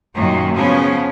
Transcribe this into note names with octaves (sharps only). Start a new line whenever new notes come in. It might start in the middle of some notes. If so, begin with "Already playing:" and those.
F#2 A#2 D#3 F#3
C#3 F3 B3 C#4